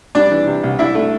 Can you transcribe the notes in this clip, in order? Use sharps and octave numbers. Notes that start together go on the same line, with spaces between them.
G3 D4 D5
E3
C3
C2
D4 E4 E5
A3